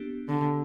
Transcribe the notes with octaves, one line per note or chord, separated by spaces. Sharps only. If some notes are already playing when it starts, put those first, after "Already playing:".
Already playing: B3 D4 G4
D3